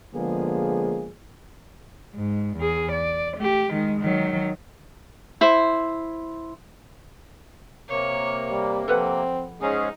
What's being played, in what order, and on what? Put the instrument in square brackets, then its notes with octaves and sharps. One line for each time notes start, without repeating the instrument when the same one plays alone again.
[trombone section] D3 F3 G#3 A#3 B3 G#4
[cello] G#2
E2 G#4
D5
A3 G4
D#3 G#3
D#3 F#3
[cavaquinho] E4 C5
[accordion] C3 A#3 [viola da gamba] C#5
[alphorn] G3
[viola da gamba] F3 [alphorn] C4 [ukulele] A4 B4 F#5
[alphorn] G#2 [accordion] G#3 C#4 G#4 [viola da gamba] D#4